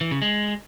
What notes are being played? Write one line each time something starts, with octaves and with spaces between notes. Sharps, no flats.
E3
C#3
G#3